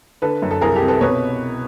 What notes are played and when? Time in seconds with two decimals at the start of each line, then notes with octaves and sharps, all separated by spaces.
0.22 D3 A4 B4
0.42 F#2
0.51 A4
0.61 C2 G#4 A#4
0.76 G4 A4
0.81 C3
0.88 A4 B4
1.01 B2 B4 C#5